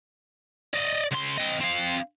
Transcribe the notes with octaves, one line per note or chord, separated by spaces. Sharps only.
D5 D#5
C#2 C6
C4 D#5
C4 F5